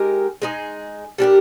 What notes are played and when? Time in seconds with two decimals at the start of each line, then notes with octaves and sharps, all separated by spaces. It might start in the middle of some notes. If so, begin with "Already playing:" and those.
Already playing: G#3 D#4 G4 A#4
0.42 G#3 D#4 G#4
1.18 G3 D4 G4 A#4